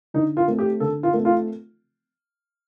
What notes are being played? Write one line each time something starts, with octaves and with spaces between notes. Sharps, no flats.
D3 D#4
F4
A3 C4
G4
D3 A4
F4
A3 C4
F4